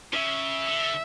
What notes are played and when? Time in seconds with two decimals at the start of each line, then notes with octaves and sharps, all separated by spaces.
0.13 C#3 E5
0.66 D3